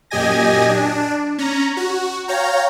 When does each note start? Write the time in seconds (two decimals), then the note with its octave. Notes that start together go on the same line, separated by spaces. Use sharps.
0.11 F#2 A#2 G4 D#5 G#5 A#6
0.68 D4
1.38 C#4 A#5
1.77 F#4
2.28 C#5 F5 G5 A#5